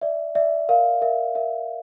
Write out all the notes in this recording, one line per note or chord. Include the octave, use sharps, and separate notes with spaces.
D5 E5
D5 E5
A#4 F5
A#4 E5
A#4 E5